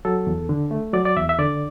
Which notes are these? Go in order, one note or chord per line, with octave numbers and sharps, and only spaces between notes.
F#3 A4
E2
D3
A3
F#3 D5
D5
E2 E5
E5
D3 D5